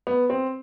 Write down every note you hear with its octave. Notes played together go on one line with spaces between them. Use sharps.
B3
C4